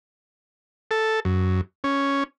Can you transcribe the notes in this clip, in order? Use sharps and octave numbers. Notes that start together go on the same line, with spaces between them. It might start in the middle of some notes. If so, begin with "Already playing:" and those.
A4
F#2
C#4